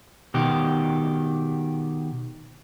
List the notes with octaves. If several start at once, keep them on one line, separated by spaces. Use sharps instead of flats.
B2 D#3 G4